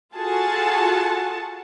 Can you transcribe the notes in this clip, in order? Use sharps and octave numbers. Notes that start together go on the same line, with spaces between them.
F4 F#4 G#4 A4 F#5 A5